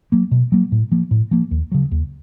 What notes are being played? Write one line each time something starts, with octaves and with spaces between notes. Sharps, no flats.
F#3 A#3
B2
F#3 A#3
A2
F3 A#3
A2
F3 A#3
D#2
C#3 F#3
D#2